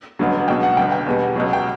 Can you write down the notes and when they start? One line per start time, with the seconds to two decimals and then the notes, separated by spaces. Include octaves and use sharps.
0.19 A1 G2 D3 F#3
0.48 C#2 B2 F#3 G5
0.63 F#5
0.77 G1 G2 D3 G5
0.92 G5
1.06 E2 B2 G3
1.36 C#2 B2 F#3
1.53 G5